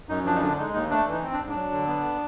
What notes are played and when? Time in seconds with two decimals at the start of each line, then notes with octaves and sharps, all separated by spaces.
0.09 F#2 D#4
0.25 F3 D4
0.35 D#4
0.41 D3 D4
0.58 G#3 D#4
0.73 D#2 D#4
0.90 A3 D4
1.07 E3 D#4
1.23 C4
1.33 D4
1.38 G#2
1.50 F#3 D4
1.71 D3
1.87 B3